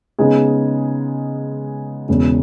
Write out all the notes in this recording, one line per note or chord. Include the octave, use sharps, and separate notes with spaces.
C#3 G#3 B3 D#4 G#4
E1 E2 C#3